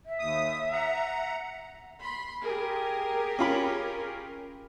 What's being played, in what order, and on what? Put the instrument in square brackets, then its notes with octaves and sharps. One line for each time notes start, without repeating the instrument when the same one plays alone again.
[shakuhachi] E5
[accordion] D#2 D#6
F#5 A#5
[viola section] B5 C6
G4 G#4 A#4
[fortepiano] C#4 F4 B5